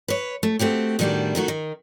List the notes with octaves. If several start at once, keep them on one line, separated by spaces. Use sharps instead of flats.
B4 C#5
A3
A3 C4 F#4 G4
E2 A2 D#3 G3 D4 F#4
D#3 A3 D#4 F#4
D#3